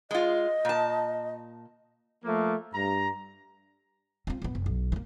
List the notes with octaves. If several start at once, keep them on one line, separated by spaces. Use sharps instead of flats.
G#3 F4 D#5
A#2 A5
F3 A3 A#3
G2 A#5
C4 F4
E1 B3
F#1
B1
E3 A#3